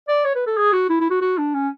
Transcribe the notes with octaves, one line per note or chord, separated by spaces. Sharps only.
D5
C#5
B4
A4
G#4
F#4
E4
E4
F#4
F#4
D4
C#4